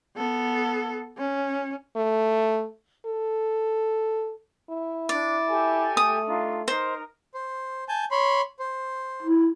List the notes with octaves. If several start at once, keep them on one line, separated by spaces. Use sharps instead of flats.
B3 A4
C#4
A3
A4
E4
D4 D5 D6
G4 A4 G#5
A3 D#6
D4 D#4 F4
D#4 A#4 C5 A#5
C5
G#5 A5 G6
C#5 B5 C6
C5
E4